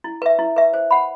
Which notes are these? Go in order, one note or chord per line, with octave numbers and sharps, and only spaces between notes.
E4
B4 E5
E4
B4 E5
C5
F#5 B5